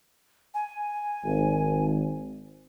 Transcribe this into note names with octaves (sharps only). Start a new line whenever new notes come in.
G#5
G#1